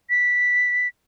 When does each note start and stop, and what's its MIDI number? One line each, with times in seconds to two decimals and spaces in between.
0.10 0.88 95